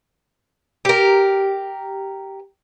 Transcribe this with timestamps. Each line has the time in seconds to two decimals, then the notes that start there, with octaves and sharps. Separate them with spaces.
0.85 G4 A#4